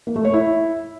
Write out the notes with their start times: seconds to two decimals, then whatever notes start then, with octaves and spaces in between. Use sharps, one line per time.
0.07 A#3
0.16 A3
0.25 C#5
0.33 E4